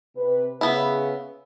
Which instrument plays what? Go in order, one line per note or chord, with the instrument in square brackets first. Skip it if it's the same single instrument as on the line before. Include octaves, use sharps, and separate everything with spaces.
[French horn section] C3 B4
[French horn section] C#3 [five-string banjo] B3 E4